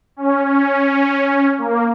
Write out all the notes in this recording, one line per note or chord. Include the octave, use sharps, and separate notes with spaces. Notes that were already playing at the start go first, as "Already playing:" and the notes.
C#4
C#4
A#3